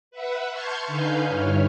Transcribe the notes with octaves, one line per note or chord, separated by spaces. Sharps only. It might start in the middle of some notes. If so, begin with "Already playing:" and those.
B4 E5 F#5
A5 C6 C#6 F6 G6 G#6
D3 D#4 B4 F5 G#5 G6
G2 E4 C#5 F6